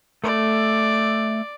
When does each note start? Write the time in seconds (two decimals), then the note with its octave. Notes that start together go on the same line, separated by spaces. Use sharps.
0.24 A3 D5